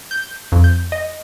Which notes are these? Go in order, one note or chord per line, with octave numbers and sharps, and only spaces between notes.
G6
F2
G6
D#5